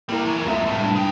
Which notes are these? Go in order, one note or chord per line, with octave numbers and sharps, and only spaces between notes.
C3 G3 A#3 E4 A#4
E3 F#3
C#2 F#2 A3 E5
C2 A2
G2
G#4 G5